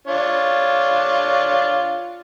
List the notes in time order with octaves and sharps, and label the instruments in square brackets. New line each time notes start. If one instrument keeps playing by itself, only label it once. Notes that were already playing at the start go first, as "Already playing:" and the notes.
[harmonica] D4 F4 C#5